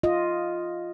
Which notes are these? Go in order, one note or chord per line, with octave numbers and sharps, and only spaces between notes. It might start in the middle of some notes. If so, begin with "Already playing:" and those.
F4 D#5